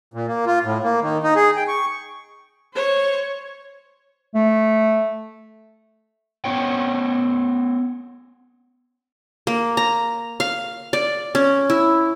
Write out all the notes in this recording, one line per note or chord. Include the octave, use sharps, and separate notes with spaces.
A#2
A#3
F4
A2
A#3
D#3
D#4
G#4
G5
C#6
C5 C#5
A3
B3 C#4 C#5 G5
A#3
A#5
F5
D5
C#4
E4